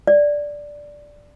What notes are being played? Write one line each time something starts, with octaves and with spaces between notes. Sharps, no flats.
D5